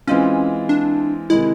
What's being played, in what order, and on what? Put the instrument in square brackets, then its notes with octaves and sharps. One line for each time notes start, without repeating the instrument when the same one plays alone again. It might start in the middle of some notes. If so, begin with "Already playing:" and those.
[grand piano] E3 G#3 C4 F4 [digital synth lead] C#4
[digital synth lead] D4
[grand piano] C3 D#3 G#3 [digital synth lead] E4